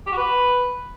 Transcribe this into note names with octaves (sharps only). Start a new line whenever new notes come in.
G4
F#4
B4